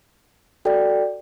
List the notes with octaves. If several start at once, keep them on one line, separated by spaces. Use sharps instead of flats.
F#4 A4 D5 G5